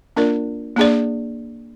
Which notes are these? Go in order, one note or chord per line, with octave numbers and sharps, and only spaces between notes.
A#3 D4 F4 A#4 D5
A#3 D4 G#4 D5